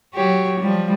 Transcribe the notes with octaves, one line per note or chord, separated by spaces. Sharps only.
F#3 G4 C#5
F3 G3